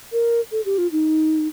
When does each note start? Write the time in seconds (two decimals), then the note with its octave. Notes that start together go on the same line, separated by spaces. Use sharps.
0.12 A#4
0.52 A4
0.65 G4
0.78 F4
0.92 D#4